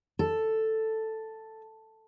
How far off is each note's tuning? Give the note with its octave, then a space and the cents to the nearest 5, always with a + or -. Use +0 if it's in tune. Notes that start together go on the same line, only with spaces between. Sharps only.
A4 +5